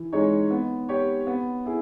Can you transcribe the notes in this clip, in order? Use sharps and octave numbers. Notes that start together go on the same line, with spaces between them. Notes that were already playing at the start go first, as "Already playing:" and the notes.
Already playing: E3
G#3 D#4 G#4 C#5
B3
G4 C#5
B3
E4 G#4